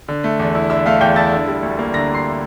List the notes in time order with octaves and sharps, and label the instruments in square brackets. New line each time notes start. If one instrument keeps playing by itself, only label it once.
[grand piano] D3
A3
E2
E4
D3 E5 E6
A3 F5 F6
E2 G5 G6
E4 A5 A6
D3
G3
D2
A#3
D3 A#5 A#6
G3
C6 C7